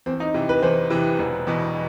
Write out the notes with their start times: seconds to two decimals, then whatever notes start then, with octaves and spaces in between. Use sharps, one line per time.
0.06 E2 C4
0.20 D#4
0.34 C3 E3
0.49 B4
0.63 E2 C5
0.90 C3 E3
1.19 E1
1.47 E2 B2